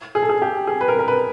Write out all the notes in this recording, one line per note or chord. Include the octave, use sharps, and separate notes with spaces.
G#4
A4
G#4
G4
G#4
B4
A#4
A#4
B4